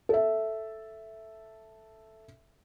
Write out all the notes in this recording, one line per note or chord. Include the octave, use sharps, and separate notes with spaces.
A4 E5